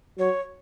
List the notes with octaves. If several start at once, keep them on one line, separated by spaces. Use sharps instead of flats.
F#3 C#5